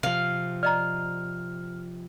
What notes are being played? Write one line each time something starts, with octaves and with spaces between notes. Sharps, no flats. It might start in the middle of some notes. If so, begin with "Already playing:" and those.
C3 F3 F5
D5 D#5 A#5 F6